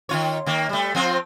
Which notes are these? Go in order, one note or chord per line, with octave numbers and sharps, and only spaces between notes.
D#3 F4 C#5
D#3 A#3
G3 A3
F3 C4 F4